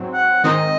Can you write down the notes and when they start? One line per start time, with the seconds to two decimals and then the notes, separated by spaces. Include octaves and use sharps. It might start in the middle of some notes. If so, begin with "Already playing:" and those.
Already playing: G#2 F#3 C4
0.14 F#5
0.44 G#2 D#3 G#3 C4 D#4 D#5